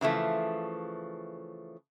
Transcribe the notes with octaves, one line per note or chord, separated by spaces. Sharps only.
C#3 E3 F3 A3